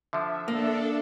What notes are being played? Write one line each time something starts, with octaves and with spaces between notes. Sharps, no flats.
D3 F3 E5
A#3 D4 A4